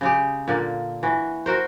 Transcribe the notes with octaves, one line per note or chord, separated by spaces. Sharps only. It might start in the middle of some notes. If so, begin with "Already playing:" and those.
C#3 G#3 G4
A#2 D3 A#3
E3 F#4
F#4 A#4 C5